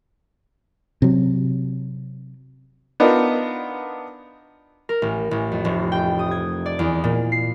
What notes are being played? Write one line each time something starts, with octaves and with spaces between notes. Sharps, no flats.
C3 F#3
B3 D4 D#4 F4 A#4
A#4
A1
A1
F2
F1
G5
D#6
G#6
D5
E2
A#2
C7